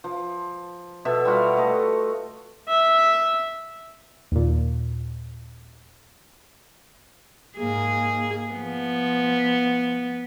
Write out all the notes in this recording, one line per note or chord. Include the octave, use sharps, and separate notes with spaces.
F3
B2 A4 E5
G3 F4 F#4 F5
A3 D#5
E5
D#2 A#2
G#2 A#3 G#4
F3 B3